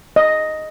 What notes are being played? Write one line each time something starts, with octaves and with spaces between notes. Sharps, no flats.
D#5